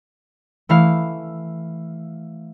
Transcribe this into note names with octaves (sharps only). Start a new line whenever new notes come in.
E3 A3 E4 F5